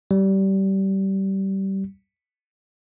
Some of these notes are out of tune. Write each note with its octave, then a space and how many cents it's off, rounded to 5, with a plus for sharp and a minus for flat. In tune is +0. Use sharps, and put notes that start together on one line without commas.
G3 -20